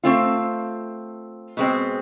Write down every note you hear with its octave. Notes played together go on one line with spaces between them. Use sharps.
A3 C4 F4
B2 G#3 C4